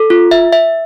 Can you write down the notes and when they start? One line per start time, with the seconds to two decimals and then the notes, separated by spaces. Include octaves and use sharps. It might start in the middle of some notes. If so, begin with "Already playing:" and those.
Already playing: A4
0.10 F4
0.31 E5
0.53 E5